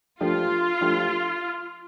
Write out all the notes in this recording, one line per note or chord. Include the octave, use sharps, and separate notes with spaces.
F3 A3 D4 F4 G4
F3 A3 D4 G4